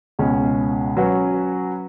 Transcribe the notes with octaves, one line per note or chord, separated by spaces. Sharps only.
C#2 B2 G#3 C#4
F#3 C#4 F#4 B4